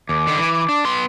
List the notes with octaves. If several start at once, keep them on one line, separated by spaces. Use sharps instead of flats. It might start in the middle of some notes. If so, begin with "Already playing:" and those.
D#2 D6
D3 D#3
E3
D4
B3 C6